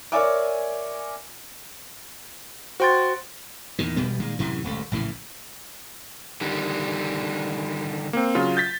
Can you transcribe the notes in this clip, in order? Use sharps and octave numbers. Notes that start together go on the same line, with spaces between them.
A#4 C#5 D5 E5 G#5 D6
F#4 C5 G5 C6 A6
E2 A#2 D#3
E1 B2 G3 B3
A#2 D#3 G#3
F#2 A2 C3 E3
D#1 C#2 A3
A#1 A2 C#3 E3
D3 D#3 G3
A#3 C4
C#3 F#3 F4
G6 A6 B6